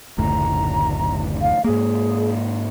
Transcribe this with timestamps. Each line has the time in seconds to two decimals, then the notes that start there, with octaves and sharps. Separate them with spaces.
0.18 F#1 D2 A2 A#5
1.40 F5
1.64 G#2 A#3 G#4